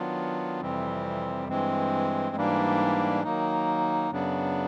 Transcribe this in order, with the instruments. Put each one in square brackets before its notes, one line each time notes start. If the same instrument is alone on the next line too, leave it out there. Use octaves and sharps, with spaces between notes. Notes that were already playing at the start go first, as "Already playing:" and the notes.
Already playing: [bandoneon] D#3 F#3 B3 D4 F4
F2 C3 E3 G3 C4
G2 E3 G#3 C4
G#2 E3 G3 A#3 D4
D#3 F#3 A#3 D#4
F#2 C#3 F#3 B3 D4